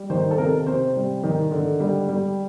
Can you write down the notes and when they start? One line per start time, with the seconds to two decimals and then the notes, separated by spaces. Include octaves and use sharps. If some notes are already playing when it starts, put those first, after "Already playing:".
Already playing: G3
0.10 D#3 C5
0.31 A4
0.38 C3 A#4
0.67 C3 C5
0.96 G3
1.23 D#3
1.51 D3
1.80 G3
2.08 G3